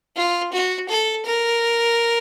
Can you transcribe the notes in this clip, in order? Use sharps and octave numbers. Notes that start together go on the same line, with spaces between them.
F4
F#4
A4
A#4